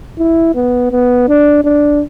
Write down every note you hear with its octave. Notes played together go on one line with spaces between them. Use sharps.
E4
B3
B3
D4
D4